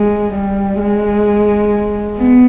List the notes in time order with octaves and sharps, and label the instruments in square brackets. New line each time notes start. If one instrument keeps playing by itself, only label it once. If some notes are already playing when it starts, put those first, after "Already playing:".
Already playing: [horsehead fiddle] G#3
G3
G#3
B3